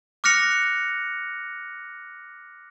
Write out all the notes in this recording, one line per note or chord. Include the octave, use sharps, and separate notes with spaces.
D6 F6 F#6 A#6 C#7 F7